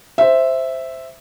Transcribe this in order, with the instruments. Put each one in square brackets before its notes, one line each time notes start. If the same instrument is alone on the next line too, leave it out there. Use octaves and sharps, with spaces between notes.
[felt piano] C5 E5